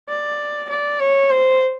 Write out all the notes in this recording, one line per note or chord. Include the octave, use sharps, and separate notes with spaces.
D5
D5
C#5
C5